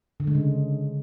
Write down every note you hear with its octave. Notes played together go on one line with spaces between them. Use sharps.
D3
G#3
C#3